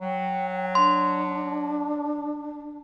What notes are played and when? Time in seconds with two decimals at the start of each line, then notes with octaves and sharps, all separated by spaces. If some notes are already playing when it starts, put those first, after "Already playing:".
0.01 F#3 G5
0.75 D4 C6